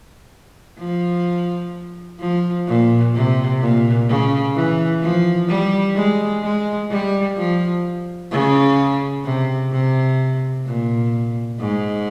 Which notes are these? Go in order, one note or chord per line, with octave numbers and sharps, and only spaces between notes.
F3
F3
A#2
C3
A#2
C#3
E3
F3
G3
G#3
G#3
G3
F3
C#3
C3
C3
A#2
G#2